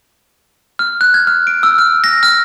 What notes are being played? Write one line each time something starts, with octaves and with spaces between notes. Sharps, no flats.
F6
F#6
G#6
F6
D7
E6
F6
A#6
F6